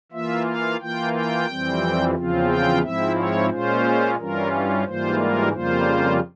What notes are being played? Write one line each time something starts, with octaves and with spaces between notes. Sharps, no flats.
E3 A#3 F4 E5
F5
E3 A#3 F4 G5
G5
F2 E3 G3 C4
E2 C#3 F3 C4 F4
G5
G#2 F3 C4 E4 E5
C#5
A#2 G#3 C#4 F4 C5
G2 E3 G3 C#4 F4 A#4
G#2 E3 G3 A#3 F4 C5
A#4
F2 C#3 G3 A#3 F4 C5